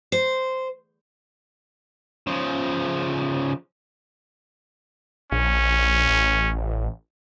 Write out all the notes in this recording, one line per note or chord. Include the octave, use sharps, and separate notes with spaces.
C5
C#3 F3
A#1 C#4
A1